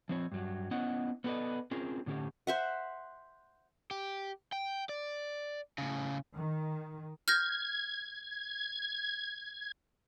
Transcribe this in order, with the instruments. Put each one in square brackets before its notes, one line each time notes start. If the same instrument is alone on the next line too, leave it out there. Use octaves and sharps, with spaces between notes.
[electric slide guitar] F3 C4 C#5
G2 F#3
B3 C#4 E4 D#5 F#5
B3 C#4 A4 B4 D5 D#5
C4 C#4 F4 G#4 A#4
A2 D3 C#4 G4
[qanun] C5 E5 F#5
[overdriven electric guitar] G4
G5
D5
A2 C#3
[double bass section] D#3
[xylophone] F6 G6 A#6 [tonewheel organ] G#6